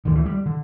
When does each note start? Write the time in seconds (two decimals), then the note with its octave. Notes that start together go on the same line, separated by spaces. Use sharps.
0.05 D2 D3 D#3
0.15 E3
0.26 G3
0.46 D3